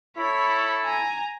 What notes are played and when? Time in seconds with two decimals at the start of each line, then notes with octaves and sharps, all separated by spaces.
0.17 E4 A4 C#5 B5
0.85 G#5 A#5